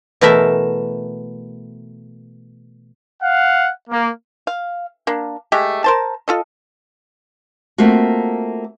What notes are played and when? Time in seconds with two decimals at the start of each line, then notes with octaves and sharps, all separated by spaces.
0.21 B2 E3 A3 A#4 E5
3.22 F5 F#5
3.90 A#3
4.47 F5
5.07 A#3 D4
5.52 G#3 A3 G4
5.84 A#4 C5 A5
6.28 F4 A4 D#5
7.78 A3 A#3 C4 F4 F#4